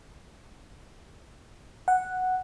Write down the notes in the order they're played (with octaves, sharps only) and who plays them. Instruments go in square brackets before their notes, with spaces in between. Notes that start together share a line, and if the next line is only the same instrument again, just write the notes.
[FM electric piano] F#5